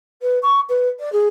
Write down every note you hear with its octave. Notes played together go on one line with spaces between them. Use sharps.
B4
C#6
B4
D5
G#4